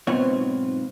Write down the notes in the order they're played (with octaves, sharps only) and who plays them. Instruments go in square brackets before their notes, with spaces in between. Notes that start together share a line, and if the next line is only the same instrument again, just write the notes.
[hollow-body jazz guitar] B1 G#2 B3 C4 F4 C#5